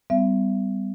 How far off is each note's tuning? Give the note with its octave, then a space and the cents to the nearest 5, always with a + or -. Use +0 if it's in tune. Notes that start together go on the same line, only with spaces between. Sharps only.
G3 +0 B3 +45 E5 +35